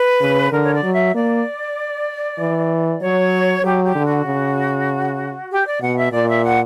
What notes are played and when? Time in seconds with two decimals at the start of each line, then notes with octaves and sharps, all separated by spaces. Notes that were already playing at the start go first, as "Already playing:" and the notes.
Already playing: B4
0.21 C#3
0.52 D3 A#4
0.63 C#5
0.73 D5
0.83 F#3
0.93 E5
1.14 A#3 D5
2.39 E3
3.01 F#3 C#5
3.63 F#3 G4
3.84 G4
3.95 D3
4.05 F#4
4.26 C#3
5.51 G4
5.65 D5
5.81 B2 F#5
5.97 E5
6.12 A#2 D5
6.28 E5
6.43 F#5